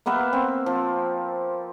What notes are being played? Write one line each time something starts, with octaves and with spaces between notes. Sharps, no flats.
A#3 B3 B4 E5
C4
F3